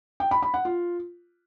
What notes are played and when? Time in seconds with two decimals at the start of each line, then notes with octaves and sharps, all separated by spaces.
0.20 G5
0.31 B5
0.42 B5
0.54 F#5
0.65 F4